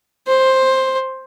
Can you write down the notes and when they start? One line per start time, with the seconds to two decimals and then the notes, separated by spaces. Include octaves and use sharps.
0.28 C5